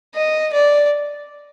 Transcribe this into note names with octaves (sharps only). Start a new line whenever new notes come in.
D#5
D5